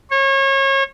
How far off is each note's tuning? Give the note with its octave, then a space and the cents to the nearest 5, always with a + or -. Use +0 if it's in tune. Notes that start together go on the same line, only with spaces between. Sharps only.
C#5 -30